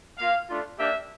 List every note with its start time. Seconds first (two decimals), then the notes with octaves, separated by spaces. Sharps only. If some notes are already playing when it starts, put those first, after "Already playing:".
0.18 A#3 F4 F5
0.49 A3 D4 F4
0.79 A#3 D4 G4 E5